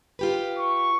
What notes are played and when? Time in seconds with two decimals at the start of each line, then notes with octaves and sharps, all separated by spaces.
0.19 F4 G4 B4
0.58 C#6